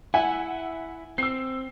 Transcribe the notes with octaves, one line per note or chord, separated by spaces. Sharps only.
E4 E5 F#5 G#5
C4 E6 C7